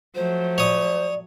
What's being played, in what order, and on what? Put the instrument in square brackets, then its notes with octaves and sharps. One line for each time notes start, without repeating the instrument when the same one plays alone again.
[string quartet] F3 F#3 A3 [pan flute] C5
[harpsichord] C#5 D#6 [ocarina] D5